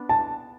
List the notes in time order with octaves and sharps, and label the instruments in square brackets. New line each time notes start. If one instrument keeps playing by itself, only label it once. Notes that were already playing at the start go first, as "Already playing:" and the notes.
Already playing: [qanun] B3 D4
[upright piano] A5